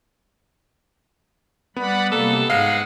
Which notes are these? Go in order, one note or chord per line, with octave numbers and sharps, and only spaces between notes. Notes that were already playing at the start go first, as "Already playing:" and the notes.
G3 B3 D5 F#5 B5
C3 G3 A#3 A4
G#2 G#3 F5 F#5